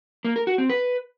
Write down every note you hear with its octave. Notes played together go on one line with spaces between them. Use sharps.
A#3
A#4
F#4
C4
B4